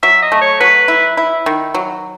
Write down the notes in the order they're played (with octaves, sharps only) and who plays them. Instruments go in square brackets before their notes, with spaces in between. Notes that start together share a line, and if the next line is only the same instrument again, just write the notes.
[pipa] F#3 [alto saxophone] E5
[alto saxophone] D#5
[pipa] A3
[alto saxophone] C#5
[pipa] F#3 [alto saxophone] B4
[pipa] E4
E4
D#3
F#3